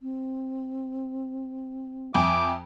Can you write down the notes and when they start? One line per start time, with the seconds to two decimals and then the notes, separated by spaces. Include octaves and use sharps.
0.02 C4
2.14 F2 E5 G5 G#5 D6